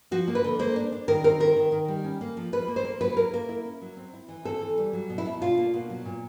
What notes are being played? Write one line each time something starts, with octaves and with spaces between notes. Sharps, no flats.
F3 F#4
A#3
B4
D3
A#3 C5
D4
D4
D#3 A#4
C4 A#4
D#3 A#4
D#3
D#3
G3
C#4
A#3
F3
F3 B4
A#3
C5
A#3
F#3 B4
E4 A#4
A#3 A#4
E4
C#4
F#3
C4
E4
E3
C4 A4
E3
G3
F#3
B2
E4
B2
D4 F4
A#3
B2
F#3
A#2